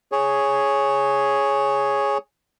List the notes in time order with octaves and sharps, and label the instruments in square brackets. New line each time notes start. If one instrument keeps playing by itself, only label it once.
[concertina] G#4 C#5